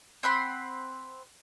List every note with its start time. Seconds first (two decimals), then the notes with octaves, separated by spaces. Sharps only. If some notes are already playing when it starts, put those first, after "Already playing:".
0.23 C4 F#5 B5 C6